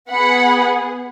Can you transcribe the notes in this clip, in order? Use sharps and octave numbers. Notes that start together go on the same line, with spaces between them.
B3 G#4 F#5 B5